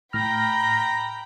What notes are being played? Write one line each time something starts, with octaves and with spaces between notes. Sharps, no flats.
A2 G5 A#5 B5 F6 A#6